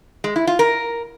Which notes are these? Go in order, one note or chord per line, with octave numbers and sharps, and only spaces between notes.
G#3
E4
F4
A#4